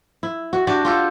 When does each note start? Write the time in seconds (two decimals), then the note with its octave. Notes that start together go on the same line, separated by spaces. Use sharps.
0.23 E4
0.53 F#4
0.67 D4 F#4 G4 D5
0.85 F4 G4 A4